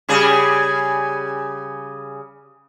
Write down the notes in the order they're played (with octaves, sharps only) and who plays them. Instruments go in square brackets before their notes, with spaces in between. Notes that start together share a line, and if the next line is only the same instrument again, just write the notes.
[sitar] C#3 G3 G#4